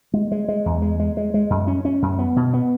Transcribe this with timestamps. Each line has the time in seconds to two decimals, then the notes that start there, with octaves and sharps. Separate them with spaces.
0.14 G#3
0.32 G#3
0.48 G#3
0.66 E2
0.82 G#3
1.00 G#3
1.17 G#3
1.34 G#3
1.50 F#2
1.67 C#4
1.85 C#4
2.02 F#2
2.19 B3
2.36 B2
2.54 B3